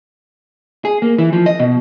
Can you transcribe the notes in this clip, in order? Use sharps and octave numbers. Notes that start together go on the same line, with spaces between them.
G#4
A#3
E3
F3
D#5
B2